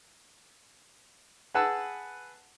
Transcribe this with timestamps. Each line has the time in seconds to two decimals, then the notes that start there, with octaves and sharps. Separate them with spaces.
1.54 G#4 B4 F#5 A5 E6